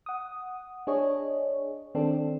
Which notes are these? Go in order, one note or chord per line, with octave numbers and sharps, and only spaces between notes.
F#5 D#6
D4 G#4 C#5 D#5
D#3 C4 D4 A4